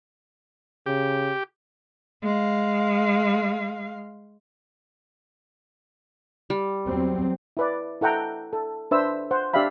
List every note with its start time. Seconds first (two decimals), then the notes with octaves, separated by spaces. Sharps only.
0.86 C#3 G4
2.23 G#3 F5
6.50 G3
6.85 E2 F#3 C4
7.57 E4 B4 D5
8.01 E4 A4 F#5 G5 A#5
8.53 A4
8.91 D4 B4 C5 E5 E6
9.31 C5 F#5
9.54 D4 G4 D5 E5 F5 B5